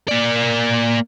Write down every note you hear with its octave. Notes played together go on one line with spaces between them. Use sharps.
A#3 D5